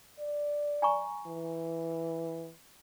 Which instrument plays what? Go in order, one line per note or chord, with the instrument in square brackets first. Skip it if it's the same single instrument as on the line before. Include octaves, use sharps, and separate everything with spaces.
[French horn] D5
[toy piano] G#5 A#5 C#6
[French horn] E3